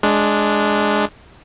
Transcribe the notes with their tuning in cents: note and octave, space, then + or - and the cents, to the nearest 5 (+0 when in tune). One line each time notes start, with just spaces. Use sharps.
G#3 +10 D4 +0